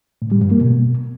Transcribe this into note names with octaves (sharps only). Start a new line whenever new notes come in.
A2
G3
G2
A#3
B2